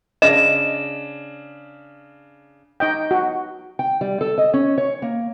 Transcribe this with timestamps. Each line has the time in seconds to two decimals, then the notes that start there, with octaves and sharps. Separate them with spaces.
0.22 C#3 D4 D#5 A#6 E7
2.80 D#4 D#5 G5
3.11 F#4
3.79 G5
4.01 G3
4.21 A4
4.38 D#5
4.54 C#4
4.78 C#5
5.02 A#3